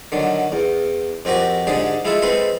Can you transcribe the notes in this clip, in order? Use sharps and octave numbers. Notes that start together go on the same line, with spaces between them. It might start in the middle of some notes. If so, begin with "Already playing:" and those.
D3 D#3 F#3
E2
F2 C4 F#4 G4 A#4
G#2 D3 G4 G#4
G#3 E4 F4 A4 E5
G#3 C4 A4 B4 C5